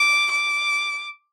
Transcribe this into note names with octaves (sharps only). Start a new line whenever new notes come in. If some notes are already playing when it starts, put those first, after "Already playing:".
Already playing: D6
D6